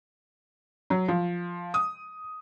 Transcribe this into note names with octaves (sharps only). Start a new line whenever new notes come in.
F#3
F3
D#6